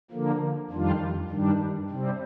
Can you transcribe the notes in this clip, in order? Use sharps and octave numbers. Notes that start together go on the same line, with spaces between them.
D3 F3 A#3
F2 D#3 G3 D4 F4
G2 D#3 G3 D4
C3 G3 C4